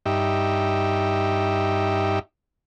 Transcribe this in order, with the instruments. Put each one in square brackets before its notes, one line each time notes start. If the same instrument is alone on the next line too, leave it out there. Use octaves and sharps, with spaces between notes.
[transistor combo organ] G2 D#4 G4 E5